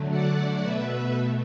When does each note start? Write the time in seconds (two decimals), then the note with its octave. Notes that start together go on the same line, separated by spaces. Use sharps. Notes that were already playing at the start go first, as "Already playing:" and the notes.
Already playing: D3 F#3 A3
0.10 D5 F#5
0.63 B2 A3 B4 E5